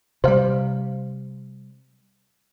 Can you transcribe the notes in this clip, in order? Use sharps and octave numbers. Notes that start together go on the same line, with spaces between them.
C3 G3 C5 F5